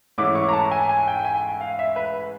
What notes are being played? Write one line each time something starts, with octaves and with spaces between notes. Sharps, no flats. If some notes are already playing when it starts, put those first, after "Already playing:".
G#2 E3 A3 C#4 E4 D6
C#6
A#5
A5
G#5
G#5
G5
G#5
F5
E5
B4